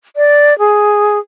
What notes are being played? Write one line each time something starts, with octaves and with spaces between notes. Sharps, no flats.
D5
G#4